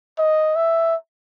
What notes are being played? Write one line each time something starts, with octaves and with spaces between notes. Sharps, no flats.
D#5
E5